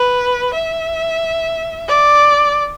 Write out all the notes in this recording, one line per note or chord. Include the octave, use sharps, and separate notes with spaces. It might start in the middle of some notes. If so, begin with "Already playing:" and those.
Already playing: B4
E5
D5